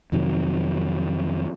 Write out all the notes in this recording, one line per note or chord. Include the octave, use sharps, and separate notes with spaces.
F2 C3 D#3 F#3